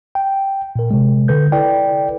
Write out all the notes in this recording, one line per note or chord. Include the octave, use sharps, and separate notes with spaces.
G5
A#2 A#4
C3 G#3
D3 A4 B4 G6
E4 A4 B4 D5 G5